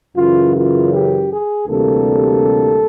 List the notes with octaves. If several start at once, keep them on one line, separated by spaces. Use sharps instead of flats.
F#2 C#3 E3 F4
F4
G4
G#4
D2 C3 E3 G3 A#3 A4